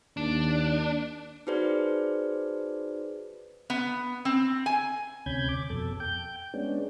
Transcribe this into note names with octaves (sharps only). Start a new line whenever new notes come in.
D#2 D4
D#4 F#4 G#4 B4 C5 D5
B3
C4
G#5
D2 C3 C#4 B5 G6 G#6
D6
F2 B2 A4
G5 G6
G#3 B3 C#4 D4